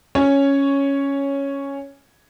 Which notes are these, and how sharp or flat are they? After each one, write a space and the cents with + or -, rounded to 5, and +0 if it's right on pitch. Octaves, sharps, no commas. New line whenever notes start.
C#4 +0 C#5 +0